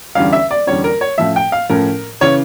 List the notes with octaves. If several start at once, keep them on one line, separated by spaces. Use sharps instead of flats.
E2 D3 G3 C#4 F5
E5
D5
E2 D3 G3 C#4 C#5
A#4
C#5
A2 F3 C#4 E5
G5
F5
A2 F3 C#4 A#4
C#3 E3 C#5